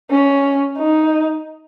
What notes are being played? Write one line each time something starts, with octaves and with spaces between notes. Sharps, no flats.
C#4
D#4